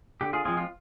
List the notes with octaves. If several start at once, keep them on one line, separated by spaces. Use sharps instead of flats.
D3 G4
F4 G#4
F3 G#3 C4 F4 G#4
F4